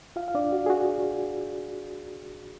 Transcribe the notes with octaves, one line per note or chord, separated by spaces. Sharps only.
F4 F5
F5
D4 D5
F#4
G#4
F#4